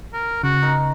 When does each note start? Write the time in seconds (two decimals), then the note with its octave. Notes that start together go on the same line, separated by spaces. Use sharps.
0.13 A#4
0.43 C#3 F#4
0.62 D#4 A#4